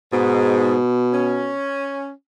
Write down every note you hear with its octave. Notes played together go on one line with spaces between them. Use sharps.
G#2 B2
C#4